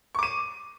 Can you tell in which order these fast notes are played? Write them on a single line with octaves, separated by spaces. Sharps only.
C#6 D6 D#7